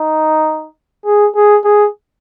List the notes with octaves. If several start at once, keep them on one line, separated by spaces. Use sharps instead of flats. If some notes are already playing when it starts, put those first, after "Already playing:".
Already playing: D#4
G#4
G#4
G#4